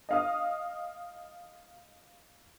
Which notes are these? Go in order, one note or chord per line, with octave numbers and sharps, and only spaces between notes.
D#5 F5 D#6